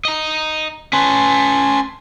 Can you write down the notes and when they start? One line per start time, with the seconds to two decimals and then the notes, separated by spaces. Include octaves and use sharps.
0.05 D#5 A#5
0.93 C#4 B4 G#5 A5 C6